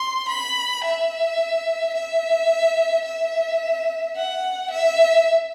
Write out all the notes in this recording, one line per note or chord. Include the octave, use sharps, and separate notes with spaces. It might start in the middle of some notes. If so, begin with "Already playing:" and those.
Already playing: C6
B5
E5
E5
E5
F#5
E5